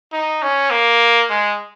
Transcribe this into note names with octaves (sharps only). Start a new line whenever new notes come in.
D#4
C#4
A#3
G#3